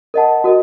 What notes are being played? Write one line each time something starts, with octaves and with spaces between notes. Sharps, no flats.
A#4 D#5 F#5 A5
F#4 A#4 D#5